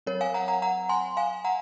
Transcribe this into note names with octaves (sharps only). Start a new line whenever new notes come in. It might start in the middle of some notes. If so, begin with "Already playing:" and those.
F#3 C4 A#4 C#5
F5 G#5
F#5 A#5
F#5 A#5
F#5 A#5
G#5 C6
F5 G#5
F#5 A#5